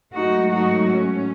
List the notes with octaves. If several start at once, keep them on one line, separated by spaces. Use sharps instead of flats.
G#2 F#3 A3 D#4 F#4
D#4 F#4
C#4